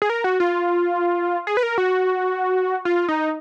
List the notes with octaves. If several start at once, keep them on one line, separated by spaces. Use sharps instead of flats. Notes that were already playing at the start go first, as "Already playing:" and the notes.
G#4
A#4
F#4
F4
G#4
B4
A#4
F#4
F4
D#4